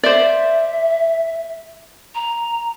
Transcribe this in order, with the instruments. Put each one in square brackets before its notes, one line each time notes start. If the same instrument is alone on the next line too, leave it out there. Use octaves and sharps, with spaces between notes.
[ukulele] C5 D5 [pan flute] E5
[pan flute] A#5